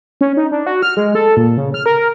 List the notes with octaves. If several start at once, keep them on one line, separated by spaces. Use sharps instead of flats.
C#4
D#4
D4
F#4
F6
G#3
A4
A#2
C#3
F6
A#4